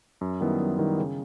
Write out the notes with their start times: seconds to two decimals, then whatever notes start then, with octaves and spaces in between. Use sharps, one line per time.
0.21 F#2
0.40 D#3 G3 B3 E4
0.60 F#2
0.79 D#3 G3 B3 E4
0.98 C#3